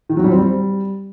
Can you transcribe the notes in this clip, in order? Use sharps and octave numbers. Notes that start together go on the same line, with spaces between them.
D#3
F#3
G3
C4
G3